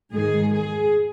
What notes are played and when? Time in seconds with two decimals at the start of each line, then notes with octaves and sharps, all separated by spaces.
0.12 G#2 D#3 G#3 G#4
0.52 G#4